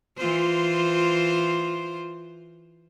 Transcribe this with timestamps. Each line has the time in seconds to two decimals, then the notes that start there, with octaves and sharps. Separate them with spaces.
0.17 E3 F4 C5